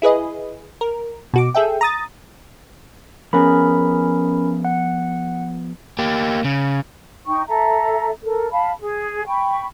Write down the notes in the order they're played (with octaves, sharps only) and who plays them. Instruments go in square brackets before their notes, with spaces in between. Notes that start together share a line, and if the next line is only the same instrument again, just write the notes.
[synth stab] E4 G#4 B4 D#5
A#4
B2 F#4 D6
G#4 A4 E5 G5
A#5 D#6 A6
[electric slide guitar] F3 B3 G#4 [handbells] C#4 A#4 B5
[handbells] F#5
[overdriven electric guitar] A#3 G4
C#3
[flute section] D#4 G5 C#6
A4 E5 A#5
A4 A#4
F5 A5 B5
G#4
G5 B5 C#6